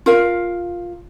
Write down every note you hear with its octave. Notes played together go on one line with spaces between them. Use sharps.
F4 A#4 F5